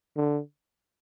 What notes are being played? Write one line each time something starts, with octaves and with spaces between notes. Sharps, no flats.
D3